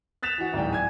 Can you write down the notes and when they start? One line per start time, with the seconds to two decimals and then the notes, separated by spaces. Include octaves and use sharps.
0.23 F#6 A6 B6 E7 F7
0.38 E3 F#4
0.53 D1 G#2 E3 D5 G5
0.73 G#5 G#6